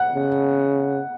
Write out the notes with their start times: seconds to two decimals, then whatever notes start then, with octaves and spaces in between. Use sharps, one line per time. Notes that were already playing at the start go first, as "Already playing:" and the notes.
Already playing: F#5
0.15 C#3